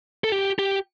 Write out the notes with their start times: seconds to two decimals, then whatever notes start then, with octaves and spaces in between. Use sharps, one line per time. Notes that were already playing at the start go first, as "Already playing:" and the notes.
0.24 A4
0.32 G4
0.59 G4